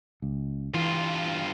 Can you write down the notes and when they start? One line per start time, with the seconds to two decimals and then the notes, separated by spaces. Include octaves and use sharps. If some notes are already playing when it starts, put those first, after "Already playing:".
0.22 C#2
0.74 G2 E3 F4